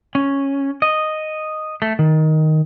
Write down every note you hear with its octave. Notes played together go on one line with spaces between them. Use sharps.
C#4
D#5
A3
D#3